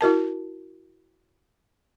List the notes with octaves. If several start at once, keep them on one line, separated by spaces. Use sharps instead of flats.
E4 F#4 A#4 A5